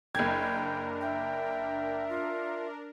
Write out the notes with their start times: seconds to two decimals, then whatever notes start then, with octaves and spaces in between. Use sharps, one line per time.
0.15 F#1 D4 A#4 G5 G#6
1.01 E5 G5
2.09 F4